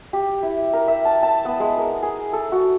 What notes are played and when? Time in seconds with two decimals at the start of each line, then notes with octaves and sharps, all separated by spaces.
0.13 G4
0.43 E4
0.73 A#4
0.88 E5
1.05 A5
1.23 A5
1.45 B3
1.60 G#3
1.78 A#4
2.02 G#4
2.33 A4
2.52 F#4